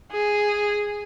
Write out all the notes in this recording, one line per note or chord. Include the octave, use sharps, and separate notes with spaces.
G#4